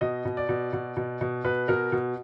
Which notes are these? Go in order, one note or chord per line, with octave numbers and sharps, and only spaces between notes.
B2 D#5
B2
D5
B2
B2
B2
B2
B2 B4
B2 A#4
B2